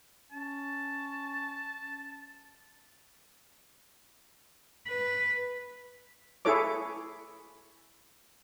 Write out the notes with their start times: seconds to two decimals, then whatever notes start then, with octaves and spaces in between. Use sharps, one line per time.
0.32 C#4 A5
4.88 B4
6.45 E4 G#4 A4 C#5 D6